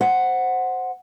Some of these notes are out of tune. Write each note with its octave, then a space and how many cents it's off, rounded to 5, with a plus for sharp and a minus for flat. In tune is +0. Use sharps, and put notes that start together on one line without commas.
C5 +0 F#5 +0